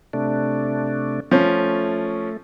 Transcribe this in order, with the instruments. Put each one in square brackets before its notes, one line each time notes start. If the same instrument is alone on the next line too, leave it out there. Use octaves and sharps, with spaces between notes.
[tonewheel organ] C3 A3 D4
[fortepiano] F3 C#4 [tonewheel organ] A3